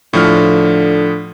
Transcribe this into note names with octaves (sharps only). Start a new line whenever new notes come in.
A2 D3 F3 F6